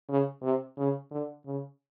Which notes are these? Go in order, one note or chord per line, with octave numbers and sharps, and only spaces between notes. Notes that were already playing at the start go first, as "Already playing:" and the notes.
C#3
C3
C#3
D3
C#3